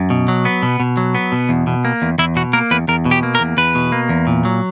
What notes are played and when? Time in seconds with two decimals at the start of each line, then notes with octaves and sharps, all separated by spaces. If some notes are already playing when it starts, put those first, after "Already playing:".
Already playing: F#2
0.10 B2
0.28 F#3
0.45 B3
0.63 B2
0.80 B2
0.97 F#3
1.15 B3
1.32 B2
1.49 E2
1.67 B2
1.85 A#3
2.02 E2
2.18 E2 E4
2.36 B2 F#4
2.53 A#3 A#4
2.71 E2 B4
2.88 E2 A#4
3.05 B2
3.11 G4
3.23 A#3
3.35 A#4
3.40 E2
3.57 E2 B4
3.75 B2
3.92 A#3
4.09 E2
4.27 A#2
4.45 F#3